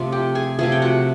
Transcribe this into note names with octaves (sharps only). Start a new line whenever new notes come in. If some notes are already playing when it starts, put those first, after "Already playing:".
Already playing: C3 F3 A3
G4 G5
G#4 G#5
C3 F3 A3 G#4 G#5
G5
F#4 F#5